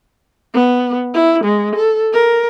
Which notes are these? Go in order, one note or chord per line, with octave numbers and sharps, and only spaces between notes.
B3
E4
G#3
A4
A#4